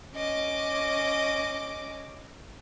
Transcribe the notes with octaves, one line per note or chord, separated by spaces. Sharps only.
C#4 D#5 D6